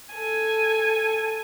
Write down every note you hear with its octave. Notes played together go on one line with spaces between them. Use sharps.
A4 G#5